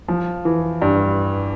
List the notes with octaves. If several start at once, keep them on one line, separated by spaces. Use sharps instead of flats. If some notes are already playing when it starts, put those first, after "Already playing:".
F3
E3
G2